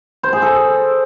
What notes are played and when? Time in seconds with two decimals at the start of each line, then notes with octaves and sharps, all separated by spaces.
0.23 C5
0.33 G#4
0.42 A4